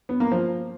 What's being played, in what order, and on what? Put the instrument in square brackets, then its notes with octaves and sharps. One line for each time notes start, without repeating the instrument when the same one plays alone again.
[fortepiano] B3
A#3
F3